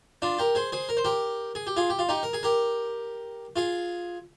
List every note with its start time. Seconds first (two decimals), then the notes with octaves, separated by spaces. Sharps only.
0.22 D4 F4
0.39 G4 A#4
0.55 G#4 C5
0.72 G#4 C5
0.89 A#4
0.97 C5
1.05 G4 A#4
1.55 G#4
1.67 G4
1.76 F4 G#4
1.90 G4
1.99 F4
2.09 D#4 G4
2.23 A#4
2.33 G#4
2.43 G4 A#4
3.56 F4 G#4